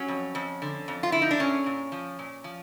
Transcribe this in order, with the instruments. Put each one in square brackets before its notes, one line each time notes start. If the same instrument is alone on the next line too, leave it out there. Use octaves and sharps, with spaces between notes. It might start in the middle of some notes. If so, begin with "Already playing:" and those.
Already playing: [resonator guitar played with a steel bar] F#3 C#4
F2
F2
D3
F2
F4
D3 E4
D#4
D4
A#2 C#4
A#2
F3
A#2
F3